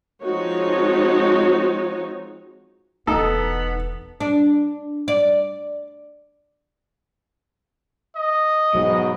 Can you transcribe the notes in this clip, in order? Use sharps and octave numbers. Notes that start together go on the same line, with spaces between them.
F3 G#3 C4 D#4 F#4 C#5
E1 E3 B3 D#4 A4
D4
D5
D#5
G#2 B2 F#3